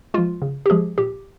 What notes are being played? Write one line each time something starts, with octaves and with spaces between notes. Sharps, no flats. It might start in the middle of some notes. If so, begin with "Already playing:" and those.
F3 G#3 F4
C#3
G4
F3 G#3 G#4
A#2 G4